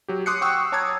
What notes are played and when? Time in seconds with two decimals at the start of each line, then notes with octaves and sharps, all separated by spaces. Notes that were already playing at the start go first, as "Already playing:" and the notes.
0.08 F#3 G4
0.26 C6 D6 D#6 F#6 C7 C#7
0.41 F#5 G5 C#6 E6
0.72 C#5 A5 A#5 D6 D#6 G#6